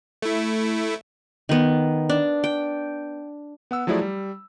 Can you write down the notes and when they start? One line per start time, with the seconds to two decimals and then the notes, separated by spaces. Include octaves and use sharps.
0.22 A3 E4
1.49 D#3 B3
2.09 D4
2.44 G5
3.71 B3 F#5 E6
3.87 F3 F#3 A3 E4 G#4 D5
4.02 G3